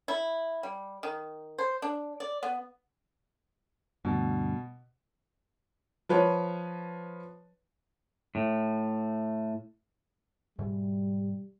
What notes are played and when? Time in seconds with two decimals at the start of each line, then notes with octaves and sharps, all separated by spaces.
0.08 E4
0.63 G3
1.03 D#3
1.58 C5
1.82 D4
2.20 D5
2.43 B3
4.05 D2 G2 B2
6.09 F3 B4 C#5
8.35 A2
10.59 G#2 B2 E3 G3